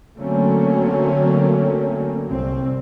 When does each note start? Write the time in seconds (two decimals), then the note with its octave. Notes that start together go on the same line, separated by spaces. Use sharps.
0.16 D3 F#3 A3 A#3 C4 C#4
2.28 C2 C4